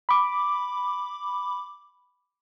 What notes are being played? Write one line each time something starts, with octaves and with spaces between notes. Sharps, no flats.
B5 D6